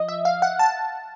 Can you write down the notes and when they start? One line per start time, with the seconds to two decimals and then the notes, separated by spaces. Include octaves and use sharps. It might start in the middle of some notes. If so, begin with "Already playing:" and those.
Already playing: F3 D#5
0.08 E5
0.25 F5
0.42 F#5
0.59 A5